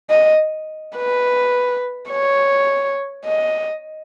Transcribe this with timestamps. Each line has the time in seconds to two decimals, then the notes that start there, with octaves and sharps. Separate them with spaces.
0.10 D#5
0.96 B4
2.10 C#5
3.25 D#5